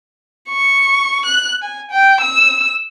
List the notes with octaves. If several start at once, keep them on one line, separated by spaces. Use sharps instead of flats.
C#6
F#6
G#5
G5
E6